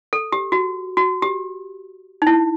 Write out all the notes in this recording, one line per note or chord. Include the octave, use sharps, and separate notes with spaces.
A4
G4
F#4
F#4
G4
D#4
E4